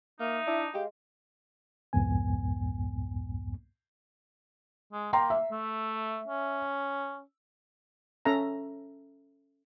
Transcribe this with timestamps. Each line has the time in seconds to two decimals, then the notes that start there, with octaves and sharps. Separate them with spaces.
0.20 A#3 D#4 E5
0.47 D4 E4
0.74 G#3 G4 F5
1.93 C2 F2 G#2 B3 G#5
4.93 G#3
5.13 A#3 G5 A#5 C6
5.30 E5
5.51 A3
6.28 C#4
8.25 C#4 A4 E5 A#5